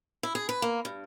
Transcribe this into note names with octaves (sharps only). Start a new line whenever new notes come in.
E4
G#4
B4
A#3
G2